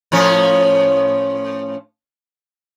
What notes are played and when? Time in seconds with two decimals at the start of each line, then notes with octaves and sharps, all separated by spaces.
0.12 A2 F3 C#4